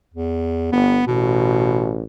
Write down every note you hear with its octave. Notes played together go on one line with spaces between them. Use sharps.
E2
G1 B3
A1 B2